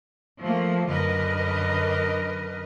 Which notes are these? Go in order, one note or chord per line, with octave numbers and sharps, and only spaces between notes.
F3 A3 A#3
F#2 D3 A#4 B4 D#5